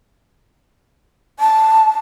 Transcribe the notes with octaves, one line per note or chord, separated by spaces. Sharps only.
A5